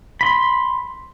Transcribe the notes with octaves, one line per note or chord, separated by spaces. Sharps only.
B5 C6